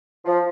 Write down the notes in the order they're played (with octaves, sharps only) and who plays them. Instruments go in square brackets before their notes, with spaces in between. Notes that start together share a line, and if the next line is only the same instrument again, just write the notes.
[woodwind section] F3